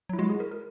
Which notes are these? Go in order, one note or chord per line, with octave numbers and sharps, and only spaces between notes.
F#3 E4
G#3 F#4
G#4
A#4
A#4